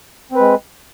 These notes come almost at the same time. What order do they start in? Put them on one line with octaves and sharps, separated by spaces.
C4 B4 G#3